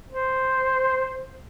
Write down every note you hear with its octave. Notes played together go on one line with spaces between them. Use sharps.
C5